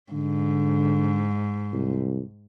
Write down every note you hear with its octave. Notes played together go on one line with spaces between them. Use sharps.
G#2 D3
C2